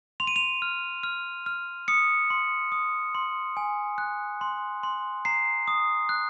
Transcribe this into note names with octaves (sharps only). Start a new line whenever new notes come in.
C6 F7
D#7
F7
F6
F6
F6
D#6 C#7
C6
D#6
C6
G#5
F#6
C6
C6
A#5 C7
D#6
F#6